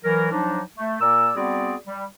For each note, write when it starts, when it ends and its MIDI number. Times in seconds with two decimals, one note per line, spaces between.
0.05 0.31 52
0.05 0.31 54
0.05 0.31 70
0.32 0.62 53
0.32 0.62 54
0.32 0.62 62
0.32 0.62 63
0.77 0.98 57
1.01 1.31 46
1.01 1.31 58
1.01 1.31 70
1.01 1.31 74
1.01 1.31 88
1.36 1.75 55
1.36 1.75 59
1.36 1.75 60
1.36 1.75 66
1.36 1.75 68
1.36 1.75 74
1.87 2.05 55